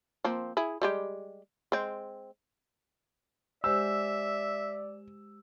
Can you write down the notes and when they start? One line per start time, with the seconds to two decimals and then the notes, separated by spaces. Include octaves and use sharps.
0.24 F3 A#3 C4
0.57 E4 G#4
0.82 G3 G#3 G4
1.72 G#3 C4
3.64 G#3 G4 C5 D5 E5 E6